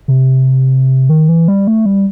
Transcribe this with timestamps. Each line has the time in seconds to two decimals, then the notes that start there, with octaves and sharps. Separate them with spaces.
0.08 C3
1.09 D#3
1.29 E3
1.48 G3
1.67 A3
1.86 G3